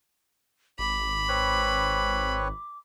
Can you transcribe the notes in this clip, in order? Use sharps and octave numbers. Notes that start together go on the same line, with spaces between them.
G#1 B5 D6
C4 B4 C#5